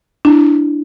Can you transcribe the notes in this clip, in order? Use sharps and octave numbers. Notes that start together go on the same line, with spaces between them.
D4 E4